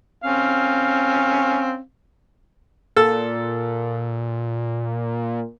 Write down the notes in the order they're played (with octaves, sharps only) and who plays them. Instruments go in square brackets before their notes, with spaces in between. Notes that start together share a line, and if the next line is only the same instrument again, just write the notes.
[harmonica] C4 C#4 F5
[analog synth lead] A#2 [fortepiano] A4 E6